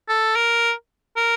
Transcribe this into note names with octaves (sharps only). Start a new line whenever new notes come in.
A4
A#4
A#4